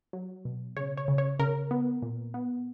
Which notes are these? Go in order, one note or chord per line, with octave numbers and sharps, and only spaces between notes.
F#3
B2
C#3 C#5
C#5
C#3
C#5
C#3 A#4
B3
A#2
B3